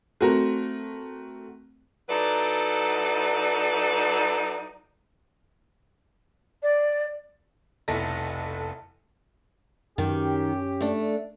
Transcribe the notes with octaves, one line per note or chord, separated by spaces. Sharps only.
A3 C4 F#4 A#4
F#3 D#4 E4 A4 B4 D5
D5
F1 B1 E4 A4 A#6
F#2 D#3 C#4 G4
A3 D4